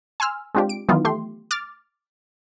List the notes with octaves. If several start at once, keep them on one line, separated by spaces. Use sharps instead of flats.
G#5 C6 E6 F6
G#3 C4 D4 F4 G4
D7
D#3 E3 F#3 B3 D#4 F4
A3 G4 C6
D6 F6 A6